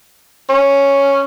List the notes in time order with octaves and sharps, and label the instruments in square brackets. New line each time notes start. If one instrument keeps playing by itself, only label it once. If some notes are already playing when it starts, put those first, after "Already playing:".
[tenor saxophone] C#4